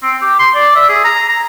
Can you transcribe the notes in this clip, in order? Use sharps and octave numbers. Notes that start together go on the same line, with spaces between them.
C4
G4
C6
D5
E5
G#4
A#5
A#5